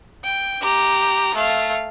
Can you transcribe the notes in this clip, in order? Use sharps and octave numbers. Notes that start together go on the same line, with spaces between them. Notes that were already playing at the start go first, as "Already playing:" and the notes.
G5
G4 A#5
A3 F5